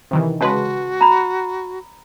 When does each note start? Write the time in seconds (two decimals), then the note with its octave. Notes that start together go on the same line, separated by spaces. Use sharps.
0.11 C3 D#3 E3
0.41 C#3 G#3 F#4 B4 A5 C6
1.01 A#5 B5